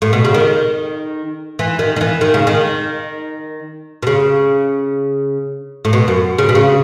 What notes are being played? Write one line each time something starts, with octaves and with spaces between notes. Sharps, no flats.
A2
B2
C#3
D#3
E3
D#3
D#3
E3
D#3
C#3
D#3
B2
C#3
A2
B2
F#2
C#3
B2
C#3